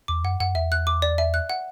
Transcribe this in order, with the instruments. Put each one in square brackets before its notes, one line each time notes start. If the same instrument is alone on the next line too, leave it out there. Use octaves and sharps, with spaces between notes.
[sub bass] E2 [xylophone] D6
[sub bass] F#2 [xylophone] F#5
[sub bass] F#2 [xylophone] F#5
[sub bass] E2 [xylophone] E5
[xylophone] F#6
D6
D5
E5
F#6
F#5